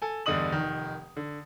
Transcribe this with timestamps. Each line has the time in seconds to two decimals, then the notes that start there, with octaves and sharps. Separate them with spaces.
0.02 A4 G#5
0.26 E2 G2 D3 D#5 D#6 F#7
0.52 F1 D#3
1.17 D3